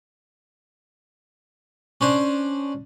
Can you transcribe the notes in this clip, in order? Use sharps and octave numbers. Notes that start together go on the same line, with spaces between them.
C#4 D4 C5